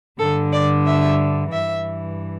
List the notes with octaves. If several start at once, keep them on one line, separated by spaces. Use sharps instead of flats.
G2 D3 A4
D5
E5
G2 E3 E5